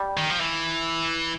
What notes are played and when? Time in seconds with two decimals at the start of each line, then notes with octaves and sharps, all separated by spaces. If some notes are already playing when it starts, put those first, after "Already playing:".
Already playing: G3
0.17 D#3
0.30 F3
0.40 E3